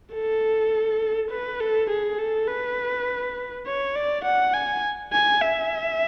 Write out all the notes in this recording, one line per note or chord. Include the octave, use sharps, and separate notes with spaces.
A4
B4
A4
G#4
A4
B4
C#5
D5
F#5
G#5
G#5
E5